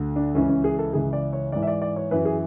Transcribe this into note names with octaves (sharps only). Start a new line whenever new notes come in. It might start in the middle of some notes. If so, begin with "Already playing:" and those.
Already playing: D2 D3
D4
C#2 C#3 E3 C#4
C#4
G#4
A4
C#2 C#3 E3 G#4
D5
C#5
G#2 E3 D5
E5
D5
D5
C#5
F#2 E3 B4
G#4